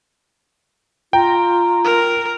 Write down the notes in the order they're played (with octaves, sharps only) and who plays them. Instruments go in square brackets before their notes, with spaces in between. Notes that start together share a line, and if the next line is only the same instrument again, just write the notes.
[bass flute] F4 [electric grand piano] G5 [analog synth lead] A#5
[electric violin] A#4